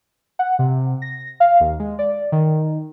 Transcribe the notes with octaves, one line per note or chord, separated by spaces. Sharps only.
F#5
C3
A#6
F5
D#2
G#3
D5
D#3